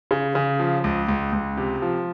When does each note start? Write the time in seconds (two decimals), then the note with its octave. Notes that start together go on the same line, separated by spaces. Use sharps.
0.11 C#3
0.35 C#3
0.59 F3
0.84 C#2
1.08 C#2
1.33 C#2
1.57 C3
1.82 F3